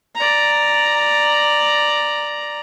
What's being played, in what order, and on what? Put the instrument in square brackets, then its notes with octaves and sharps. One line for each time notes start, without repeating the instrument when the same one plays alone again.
[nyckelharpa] D5 A#5